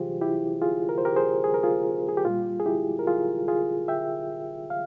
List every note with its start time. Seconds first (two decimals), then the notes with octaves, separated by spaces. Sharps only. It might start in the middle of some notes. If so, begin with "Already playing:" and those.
Already playing: C3 E3 G3 F4 G4 G#4 C5
0.21 E4 G4
0.62 F4 G#4
0.89 A#4
0.98 C5
1.05 G4 A#4
1.16 G#4 C5
1.44 G#4
1.54 A#4
1.63 F4 G#4
2.09 G#4
2.17 G4
2.25 A#2 G3 F4
2.60 G#4
2.66 E4 G4
2.99 A#4
3.07 F4 G#4
3.48 F4 G#4
3.88 E5 G5
4.70 F5